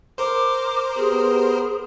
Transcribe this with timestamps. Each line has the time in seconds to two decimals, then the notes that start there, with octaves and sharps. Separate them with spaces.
0.18 A#4 C5 D6
0.97 B3 G4 G#4